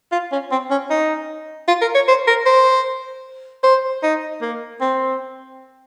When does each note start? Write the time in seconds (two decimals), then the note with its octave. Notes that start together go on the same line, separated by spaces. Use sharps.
0.12 F4
0.32 C#4
0.52 C4
0.71 C#4
0.90 D#4
1.68 F4
1.82 A#4
1.95 C#5
2.08 C5
2.28 A#4
2.46 C5
3.63 C5
4.03 D#4
4.41 A#3
4.81 C4